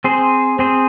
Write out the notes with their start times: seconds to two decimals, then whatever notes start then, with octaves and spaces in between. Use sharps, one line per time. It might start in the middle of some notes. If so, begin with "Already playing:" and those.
0.04 C4 G#4 C5
0.59 C4 G#4 C5